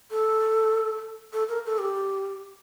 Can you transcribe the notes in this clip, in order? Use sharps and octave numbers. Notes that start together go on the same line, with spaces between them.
A4
A4
A#4
A4
G4